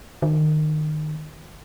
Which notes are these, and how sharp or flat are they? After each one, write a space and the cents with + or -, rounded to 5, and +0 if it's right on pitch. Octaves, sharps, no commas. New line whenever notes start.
D#3 -25